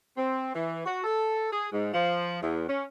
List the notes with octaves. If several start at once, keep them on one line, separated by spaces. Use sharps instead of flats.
C4
E3
F#4
A4
G#4
G#2
F3
E2
C#4